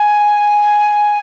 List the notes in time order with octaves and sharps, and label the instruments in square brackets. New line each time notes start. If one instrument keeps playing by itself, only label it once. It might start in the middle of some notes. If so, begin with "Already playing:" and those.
Already playing: [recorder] G#5